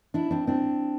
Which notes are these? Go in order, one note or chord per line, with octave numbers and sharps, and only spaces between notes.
D4 E4
C4 D4
C4 D4